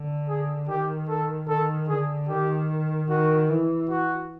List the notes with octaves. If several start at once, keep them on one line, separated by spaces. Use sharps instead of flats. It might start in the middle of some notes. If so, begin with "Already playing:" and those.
Already playing: D3
G#4
D#3 G4
A4
D#3 A4
D3 G#4
D#3 G4
D#3 F#4
E3
F#4